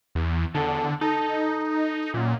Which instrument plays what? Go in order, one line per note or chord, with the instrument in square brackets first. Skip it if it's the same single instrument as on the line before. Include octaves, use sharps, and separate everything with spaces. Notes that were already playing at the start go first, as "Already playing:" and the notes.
[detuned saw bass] E2
[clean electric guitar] E2 A4 [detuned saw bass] D3
[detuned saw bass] D#4 [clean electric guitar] A4
[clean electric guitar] F#2 [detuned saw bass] A#2